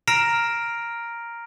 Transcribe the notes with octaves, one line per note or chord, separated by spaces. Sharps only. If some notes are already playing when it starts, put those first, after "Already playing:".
A#5 F6 A#6 C7 D7 F7